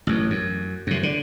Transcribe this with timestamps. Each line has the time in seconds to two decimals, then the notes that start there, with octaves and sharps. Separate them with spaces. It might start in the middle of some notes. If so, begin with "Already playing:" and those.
0.07 A1 F#2
0.30 F#2
0.87 F#2 C3
1.03 D3